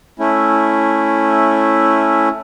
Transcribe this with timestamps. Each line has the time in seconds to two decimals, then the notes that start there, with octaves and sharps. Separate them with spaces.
0.19 A3 C#4 E4